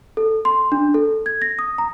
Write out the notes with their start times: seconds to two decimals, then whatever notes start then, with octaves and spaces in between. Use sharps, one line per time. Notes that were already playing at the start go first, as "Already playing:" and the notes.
0.17 A4
0.45 C6
0.72 D4
0.94 A4
1.26 G#6
1.42 A#6
1.59 D#6
1.78 A#5